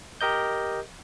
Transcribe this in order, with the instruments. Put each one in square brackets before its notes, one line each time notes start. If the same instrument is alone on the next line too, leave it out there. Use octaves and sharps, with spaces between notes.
[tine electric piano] G4 A#4 D#5 G6